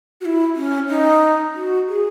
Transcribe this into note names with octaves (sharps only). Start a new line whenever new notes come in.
F#4
E4
C#4
D#4
F#4
G#4